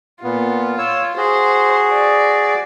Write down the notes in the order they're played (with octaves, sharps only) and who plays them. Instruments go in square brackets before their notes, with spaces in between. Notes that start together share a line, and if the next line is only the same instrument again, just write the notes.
[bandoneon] A#2 B3 [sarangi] F4
[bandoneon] C#5 E6
[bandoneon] F#4 G#4 [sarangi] C5
[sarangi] D5